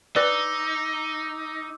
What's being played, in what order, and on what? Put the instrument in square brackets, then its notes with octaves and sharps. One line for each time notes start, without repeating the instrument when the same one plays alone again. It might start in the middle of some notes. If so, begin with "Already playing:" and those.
[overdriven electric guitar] D#4 [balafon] B4 D5 [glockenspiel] D6 E6